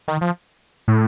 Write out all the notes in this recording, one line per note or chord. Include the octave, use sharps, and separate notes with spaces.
D#3
F3
A2